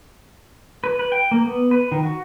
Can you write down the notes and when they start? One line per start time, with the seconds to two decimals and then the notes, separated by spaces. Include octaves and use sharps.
0.84 B4
0.99 B4
1.12 G5
1.31 A#3
1.46 B3
1.71 B4
1.92 D#3
2.03 F#4